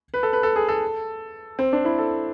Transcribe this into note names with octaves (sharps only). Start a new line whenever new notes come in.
B4
A4
B4
A4
G#4
A4
C4
D4
E4
A4